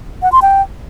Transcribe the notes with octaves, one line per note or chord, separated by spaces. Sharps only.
F#5
C6
G5